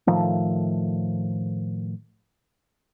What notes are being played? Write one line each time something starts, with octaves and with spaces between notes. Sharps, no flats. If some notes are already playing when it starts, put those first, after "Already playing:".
A2 D#3 F3 A3